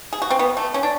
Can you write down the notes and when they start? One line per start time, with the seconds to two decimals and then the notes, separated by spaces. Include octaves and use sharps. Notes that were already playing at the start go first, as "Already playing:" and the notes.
0.13 G#4
0.22 F#4
0.30 C4
0.39 B3
0.57 A3
0.74 C#4
0.83 D4